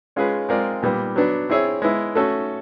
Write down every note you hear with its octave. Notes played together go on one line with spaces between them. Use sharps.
G#3 C#4 F4 G#4 B4
G#3 C4 F4 A#4 D5
A#2 G3 B3
F#3 B3 D4
C4 E4 G#4 C#5 E5
G#3 B3 E4
A3 C#4 F#4 A4